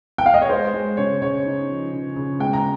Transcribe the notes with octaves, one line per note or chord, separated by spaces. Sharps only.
G5
F5
D#5
C#5
G#3 C5
G#3
C#3 C#5
C#3 C#5
D#4
F3
C#3
C#3
G#3 G5
A#5